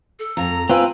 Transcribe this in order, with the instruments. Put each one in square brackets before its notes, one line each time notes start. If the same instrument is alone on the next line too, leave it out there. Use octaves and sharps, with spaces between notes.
[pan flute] A4
[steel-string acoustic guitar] F2 [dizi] A#5
[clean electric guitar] C4 F4 [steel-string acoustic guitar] B4 G5 G#5 [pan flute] E6